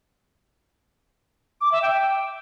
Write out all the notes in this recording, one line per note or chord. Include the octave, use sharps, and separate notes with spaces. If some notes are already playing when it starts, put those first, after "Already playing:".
D6
E5
G5